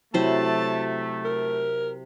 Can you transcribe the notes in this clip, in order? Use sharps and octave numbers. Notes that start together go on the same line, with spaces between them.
C3 F#3 A3 E4 C5 A5
A#4